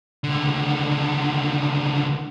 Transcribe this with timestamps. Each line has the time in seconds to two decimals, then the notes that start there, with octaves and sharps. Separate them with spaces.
0.24 C#2 D3